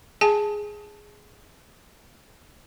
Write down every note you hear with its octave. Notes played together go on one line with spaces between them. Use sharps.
G#4 G#5 A5